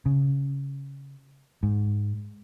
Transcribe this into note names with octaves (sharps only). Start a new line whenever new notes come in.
C#3
G#2